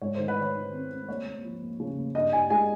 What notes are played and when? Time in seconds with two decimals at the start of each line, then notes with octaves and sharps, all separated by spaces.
0.01 G#2 C#5
0.15 D#3 C5
0.28 B4
0.37 D#3 C#5
0.55 D#3
0.73 C4
0.91 C4
1.08 D#2 C#5
1.26 D#2
1.44 F3
1.62 D#2
1.80 C#3
1.98 D#2
2.15 G2 D#5
2.33 G2 G#5
2.50 G#3 G#5